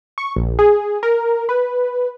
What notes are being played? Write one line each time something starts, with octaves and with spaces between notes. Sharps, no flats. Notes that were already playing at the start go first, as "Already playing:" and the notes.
C#6
A#1
G#4
A#4
B4